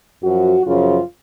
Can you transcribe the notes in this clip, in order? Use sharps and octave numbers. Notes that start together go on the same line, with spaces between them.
F#2 F3 F#4
F#2 C#3 F3 F4